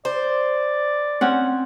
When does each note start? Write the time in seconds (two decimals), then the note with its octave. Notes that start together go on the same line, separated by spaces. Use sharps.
0.05 C5 D5
1.21 C4 C#4 F#5